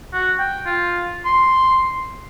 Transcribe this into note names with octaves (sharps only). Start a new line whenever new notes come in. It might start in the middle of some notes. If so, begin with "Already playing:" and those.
F#4
G5
F4
C6